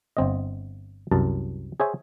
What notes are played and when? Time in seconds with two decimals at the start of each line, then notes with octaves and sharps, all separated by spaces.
0.17 G1 C4 D#5
1.12 C2 F#2 A5
1.80 G#4 C5 C#5 E5 G#5